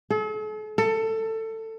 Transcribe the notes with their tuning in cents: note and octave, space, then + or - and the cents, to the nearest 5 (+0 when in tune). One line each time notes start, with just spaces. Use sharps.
A4 -45
A4 +20